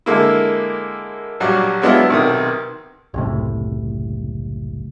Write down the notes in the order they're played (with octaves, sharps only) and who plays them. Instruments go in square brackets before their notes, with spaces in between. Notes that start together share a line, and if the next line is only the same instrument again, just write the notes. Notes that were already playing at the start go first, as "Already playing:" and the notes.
[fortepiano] D3 G#3 A#3 E4
A#1 F#3 G3 F#4
F#3 G#3 B3 D4 E4 F4
B1 C3 D#3 D#6
[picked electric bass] F#1 C2 A2